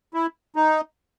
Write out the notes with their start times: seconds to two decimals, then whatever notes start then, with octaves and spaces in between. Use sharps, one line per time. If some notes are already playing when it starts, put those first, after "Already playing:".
0.14 E4
0.56 D#4